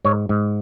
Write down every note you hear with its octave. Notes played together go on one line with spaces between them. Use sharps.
G#2 C#5
G#2